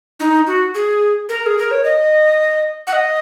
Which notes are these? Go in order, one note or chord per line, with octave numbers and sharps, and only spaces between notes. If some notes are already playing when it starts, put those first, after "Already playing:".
D#4
F#4
G#4
A#4
G#4
A#4
C#5
D#5
F#5
D#5